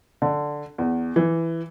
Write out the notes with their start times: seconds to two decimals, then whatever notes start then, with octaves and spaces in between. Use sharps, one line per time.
0.22 D3
0.78 E2
1.16 E3